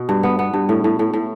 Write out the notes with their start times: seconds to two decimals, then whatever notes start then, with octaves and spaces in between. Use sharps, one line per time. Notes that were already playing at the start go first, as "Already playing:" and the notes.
Already playing: B2
0.09 G2
0.23 B3
0.39 B3
0.54 G2
0.69 A2
0.84 A2
0.99 A2
1.13 A2